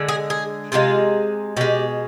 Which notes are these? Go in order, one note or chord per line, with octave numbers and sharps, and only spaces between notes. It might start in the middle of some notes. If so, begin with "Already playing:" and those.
Already playing: D3 G#3
G#4
G#4
C3 F3 G#3 F4
B2 G#3 G4